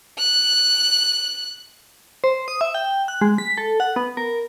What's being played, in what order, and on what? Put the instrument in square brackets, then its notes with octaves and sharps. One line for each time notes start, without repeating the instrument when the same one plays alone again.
[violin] F#6
[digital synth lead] C5
D#6
E5
G5
F#6
G#3
B6
A4
F#5
B3
A#4